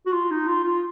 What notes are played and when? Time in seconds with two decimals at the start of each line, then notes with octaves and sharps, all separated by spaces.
0.06 F#4
0.13 F4
0.31 D#4
0.47 F4
0.64 F4